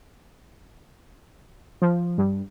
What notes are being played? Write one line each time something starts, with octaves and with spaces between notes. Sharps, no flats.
F3
G2